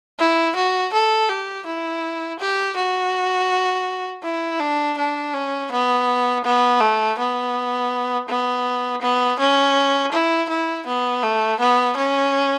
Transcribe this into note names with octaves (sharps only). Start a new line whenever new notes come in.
E4
F#4
A4
G4
E4
G4
F#4
E4
D4
D4
C#4
B3
B3
A3
B3
B3
B3
C#4
E4
E4
B3
A3
B3
C#4